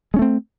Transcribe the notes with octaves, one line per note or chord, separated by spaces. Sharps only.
G#3 A3 C4 C#4